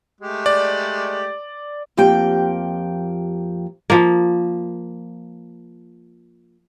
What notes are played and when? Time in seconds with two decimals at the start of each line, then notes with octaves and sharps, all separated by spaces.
0.21 G#3 A3 G4
0.46 D5
1.97 F2 F3 A#3 G4 G5
3.90 F3 A#3